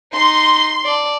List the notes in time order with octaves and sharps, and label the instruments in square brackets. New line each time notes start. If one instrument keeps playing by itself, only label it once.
[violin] D#4 C7 [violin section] C6
[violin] D5 A5